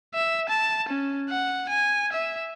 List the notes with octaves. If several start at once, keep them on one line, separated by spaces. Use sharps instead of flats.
E5
A5
C#4
F#5
G#5
E5